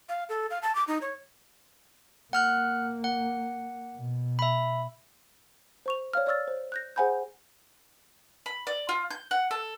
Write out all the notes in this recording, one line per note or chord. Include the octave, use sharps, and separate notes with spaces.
F5
A4
F5
A5
D6
D#4
C#5
A#3 F#5 F6 F#6
F#5
B2
E5 B5
C5 C#6 F7
C#5 D5 F5 F6
C#5 D5 C#6 E6 F6 A6
C5
F#6 G6 A#6
G#4 C5 F#5 G#5 B5 G6
B5
D5
F4
G6
F#5
A4